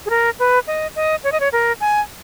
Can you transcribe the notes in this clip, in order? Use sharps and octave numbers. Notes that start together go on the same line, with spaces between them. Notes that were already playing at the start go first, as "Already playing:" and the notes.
G#4
A#4
B4
D#5
D#5
C#5
D#5
C#5
A#4
G#5